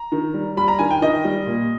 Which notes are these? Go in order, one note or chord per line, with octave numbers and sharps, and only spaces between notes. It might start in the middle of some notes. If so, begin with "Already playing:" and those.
Already playing: A#5
D#3
G3
G3 B5
A#5
D#3 G#5
G5
D#3 D#5
G3
A#2